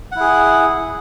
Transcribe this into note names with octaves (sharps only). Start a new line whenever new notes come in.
E4 G#4 F#5